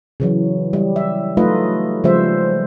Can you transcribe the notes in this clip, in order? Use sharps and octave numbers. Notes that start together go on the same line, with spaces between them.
C#3 E3 F#3
G3
E5
F#3 A3 D#4 F4 B4 D#5
C#3 F3 G3 G#3 C5 E5